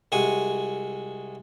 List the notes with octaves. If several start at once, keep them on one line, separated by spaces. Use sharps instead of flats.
C2 G#3 F#4 G#5